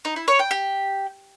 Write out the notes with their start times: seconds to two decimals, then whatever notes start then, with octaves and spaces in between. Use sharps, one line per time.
0.05 D#4
0.16 E4
0.28 C#5
0.39 G5
0.51 G4